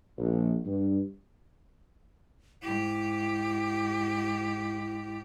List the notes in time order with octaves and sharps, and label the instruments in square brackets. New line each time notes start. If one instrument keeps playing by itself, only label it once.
[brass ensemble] A#1
G2
[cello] G#2 G4 [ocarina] E4